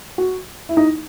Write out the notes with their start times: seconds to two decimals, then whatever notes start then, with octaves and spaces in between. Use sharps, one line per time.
0.18 F#4
0.69 E4
0.77 D#4